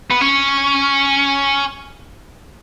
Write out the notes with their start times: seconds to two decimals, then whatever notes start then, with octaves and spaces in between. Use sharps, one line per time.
0.11 B3
0.21 C#4